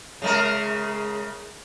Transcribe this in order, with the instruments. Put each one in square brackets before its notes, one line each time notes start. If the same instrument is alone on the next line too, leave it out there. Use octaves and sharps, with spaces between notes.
[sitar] C#3 G#3 A#4